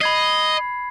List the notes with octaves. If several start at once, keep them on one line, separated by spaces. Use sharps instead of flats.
D#5 B5 G#6 C7